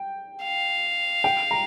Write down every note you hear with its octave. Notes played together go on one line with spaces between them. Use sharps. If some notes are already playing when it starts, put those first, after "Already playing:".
Already playing: G5
F5
G5
A#5